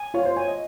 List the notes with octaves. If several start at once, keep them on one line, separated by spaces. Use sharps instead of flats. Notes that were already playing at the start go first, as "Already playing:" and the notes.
Already playing: G#5
F4 C#5
C5
C#5 G#5
D#5